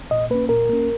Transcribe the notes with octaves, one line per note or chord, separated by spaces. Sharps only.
A#2 D#5
A#3 C#4 B4
A#2 A#4
A#3 C#4